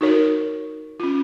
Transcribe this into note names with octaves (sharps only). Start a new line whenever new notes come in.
D#4 F#4 A#4 C#5
C#4 F4